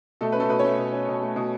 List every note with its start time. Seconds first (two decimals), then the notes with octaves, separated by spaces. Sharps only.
0.21 B2 A3 A4
0.32 C#4 B4
0.40 A3 A4
0.49 B2 B4
0.59 A3 C#4 C#5
0.78 B2
0.93 C#4
1.08 B2
1.22 A3
1.36 B2